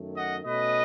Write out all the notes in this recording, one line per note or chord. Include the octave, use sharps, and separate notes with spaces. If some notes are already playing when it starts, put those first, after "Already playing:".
Already playing: F#2 D#3 A3
D#5 F#5
B2 A3 C#4 B4 D#5